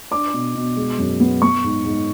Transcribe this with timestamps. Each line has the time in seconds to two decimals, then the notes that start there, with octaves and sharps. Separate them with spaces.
0.11 D4 D6
0.34 B2
0.55 B2
0.77 G#3
0.99 F#2
1.20 B3
1.42 B3 C#6
1.64 G#2
1.86 G#2